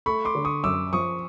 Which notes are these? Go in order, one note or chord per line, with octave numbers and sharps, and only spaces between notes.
A3 B5 C#6
C6 D6
D3
C#6 D#6
F#2 D6 E6
F3 C#6 D#6